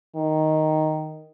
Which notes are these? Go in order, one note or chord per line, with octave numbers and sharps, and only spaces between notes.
D#3